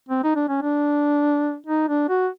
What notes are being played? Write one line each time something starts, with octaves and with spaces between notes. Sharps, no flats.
C4
D#4
D4
C#4
D4
D#4
D4
F#4